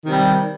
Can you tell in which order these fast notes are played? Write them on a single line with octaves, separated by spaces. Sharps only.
D#3 C3 G3